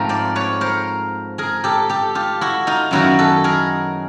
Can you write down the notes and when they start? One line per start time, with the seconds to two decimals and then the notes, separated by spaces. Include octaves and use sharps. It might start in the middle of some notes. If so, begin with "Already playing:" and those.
Already playing: G#2 F3 A3 C4 A#4
0.09 C5 D5
0.35 B4 C#5
0.61 A#4 C5
1.38 G#4 A#4
1.64 G4 A4
1.89 G4 A4
2.15 F4 G4
2.41 E4 F#4
2.67 D#4 F4
2.91 F#2 D#3 F#3 B3 E4 F#4
3.19 A4 B4
3.44 G#4 A#4